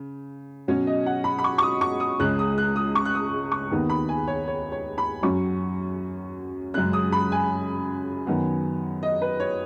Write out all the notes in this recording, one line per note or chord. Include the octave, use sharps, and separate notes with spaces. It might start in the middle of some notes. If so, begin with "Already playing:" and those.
Already playing: C#3
B2 F#3 C#4 C#5
D#5
F#5
B5
B5
C#6
C#6
D#6
C#6
D#6
C#2 C#3 G#3 C#4 F#6
D#6
F#6
D#6
C#6
F#6
D#6
C#6
D#2 D#3 B3
B5
G#5
C#5
C#5
C#5
B5
F#2 F#3 C#4 C#6
F#2 C#3 G#3 C#4 F#6
D#6
B5
G#5
F#2 D#3 B3
D#5
B4
C#5